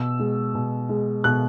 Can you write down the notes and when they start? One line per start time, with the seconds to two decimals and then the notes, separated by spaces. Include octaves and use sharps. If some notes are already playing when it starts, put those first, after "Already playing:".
Already playing: B2 E6
0.19 G#3
0.55 B2
0.89 G#3
1.24 B2 F#6